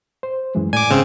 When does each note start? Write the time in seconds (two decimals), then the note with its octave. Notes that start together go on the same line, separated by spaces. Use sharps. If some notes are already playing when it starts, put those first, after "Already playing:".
0.23 C5
0.55 F#2 E3 G#3
0.73 A2 D5 G#5 D6
0.90 G#2 C#3 C4